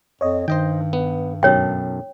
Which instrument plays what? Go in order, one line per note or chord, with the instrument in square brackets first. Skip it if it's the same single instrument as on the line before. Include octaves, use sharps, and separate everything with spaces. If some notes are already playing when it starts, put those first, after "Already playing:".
[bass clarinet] F2 [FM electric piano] C#5 D#5
[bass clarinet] G2 [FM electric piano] D#3 [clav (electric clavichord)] C5 D#5 G5
[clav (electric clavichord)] B3
[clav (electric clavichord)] B1 F#2 A5 [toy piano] C#5 G5